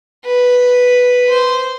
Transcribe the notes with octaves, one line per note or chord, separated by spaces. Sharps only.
B4
C5